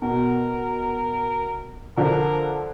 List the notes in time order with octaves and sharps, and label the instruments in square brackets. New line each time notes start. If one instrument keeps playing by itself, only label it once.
[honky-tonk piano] B2 [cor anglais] A#4
[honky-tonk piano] D3 F3 D4 [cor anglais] A#4